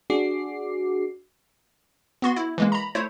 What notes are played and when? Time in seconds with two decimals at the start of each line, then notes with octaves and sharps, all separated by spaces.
0.10 D4 F#4 G#4 D6 C7
2.22 B3 F#4 C6
2.36 E4
2.58 E3 G#3 A#3
2.72 A#5 B5
2.95 A3 E4 C5 C#5